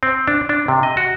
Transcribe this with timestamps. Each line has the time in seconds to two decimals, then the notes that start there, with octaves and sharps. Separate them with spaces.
0.03 C4
0.28 D4
0.49 D4
0.68 C3
0.83 D#5
0.97 F#4